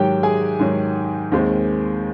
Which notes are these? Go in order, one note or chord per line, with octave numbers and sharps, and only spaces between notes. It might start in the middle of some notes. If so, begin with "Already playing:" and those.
Already playing: G#2 D#3 F#3 G4 G5
G#4 G#5
G#2 D#3 F#3
D#2 D#3 G#3 C4